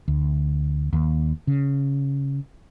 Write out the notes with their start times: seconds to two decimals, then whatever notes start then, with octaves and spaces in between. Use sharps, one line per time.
0.08 D2
0.93 D#2
1.47 C#3